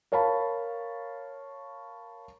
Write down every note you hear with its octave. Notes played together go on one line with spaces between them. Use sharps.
A#4 C#5 F5 A5 B5